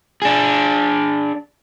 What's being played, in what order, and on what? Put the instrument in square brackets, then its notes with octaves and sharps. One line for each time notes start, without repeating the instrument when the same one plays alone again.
[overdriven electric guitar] D4 G#4